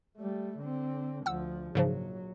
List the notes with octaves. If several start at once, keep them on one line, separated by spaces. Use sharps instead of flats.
G3 A3
D3 C4
D2 F3 F#5 E6
A#1 G#2 C#3 F3 F#3